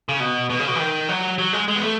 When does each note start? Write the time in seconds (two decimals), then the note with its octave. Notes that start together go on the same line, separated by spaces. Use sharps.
0.09 C#3
0.20 B2
0.50 B2
0.59 C#3
0.68 B2
0.75 E3
0.79 D#3
1.09 F#3
1.38 F#3
1.53 G#3
1.68 G#3
1.76 B3
1.83 A3